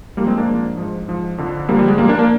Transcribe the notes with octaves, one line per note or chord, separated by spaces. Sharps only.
G#2 F3 G3 A#3
G#3 C4
A#3 D4
G#2 F3
G#2 F3
G#2 F3
F2 D3 F3
F2 D3 F3 G3 A#3
G3
G#3
A#2 F3 G3 A#3
A#3 D4
A#3 D4